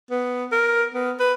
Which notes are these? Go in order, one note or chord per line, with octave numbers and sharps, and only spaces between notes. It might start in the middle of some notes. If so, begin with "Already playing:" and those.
B3
A#4
B3
B4